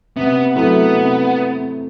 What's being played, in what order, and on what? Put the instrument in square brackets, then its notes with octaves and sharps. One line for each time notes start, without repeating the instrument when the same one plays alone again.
[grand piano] C3 [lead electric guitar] B3
[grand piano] F#3 A3 E4 [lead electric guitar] B3
[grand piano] C3